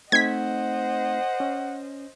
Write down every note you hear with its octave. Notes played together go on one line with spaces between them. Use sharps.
A3 C4 D#4 C5 D#5 F#5 G#6 B6
C#4